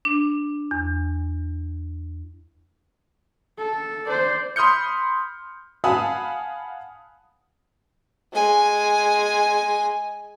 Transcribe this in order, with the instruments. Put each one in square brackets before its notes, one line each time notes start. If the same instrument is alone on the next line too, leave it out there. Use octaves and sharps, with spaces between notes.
[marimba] D4
E2
[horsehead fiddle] A4
C5 D5
[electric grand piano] B5 C6 D#6 F6 G6 C#7
[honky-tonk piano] F5 F#5 G#5 A5 B5 D#6
[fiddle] G#3 G#5